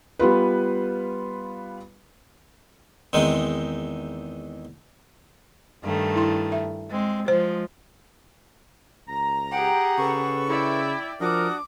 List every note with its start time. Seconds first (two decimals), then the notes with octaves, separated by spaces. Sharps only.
0.19 G3 B3 F4 B4
3.13 E2 D#3 G#3 C4 D#4
5.83 G2 D#3 A3
6.15 E4 C6
6.52 E5
6.90 G#3 C4
7.28 F3 G#3 C5
9.08 C#2 A#5
9.51 G4 G#4 F#5 G5
9.98 C#3 A4 B4 C#6
10.49 E4 D5 E5 G5
11.20 F3 D4 F#4 A#4 D6 D#6